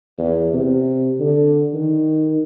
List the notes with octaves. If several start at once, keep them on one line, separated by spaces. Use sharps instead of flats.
E2
C3
D3
D#3